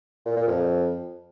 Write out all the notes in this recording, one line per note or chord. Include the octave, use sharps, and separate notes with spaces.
A#2
A#2
F2